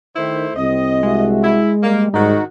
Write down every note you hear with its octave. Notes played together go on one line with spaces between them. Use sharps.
D#3 A3 E4 C5
C2 C4 D#5
G#3 D4 F#4 E5
E4
G3 A#3
G#2 D#3 G#3 D#4 F#4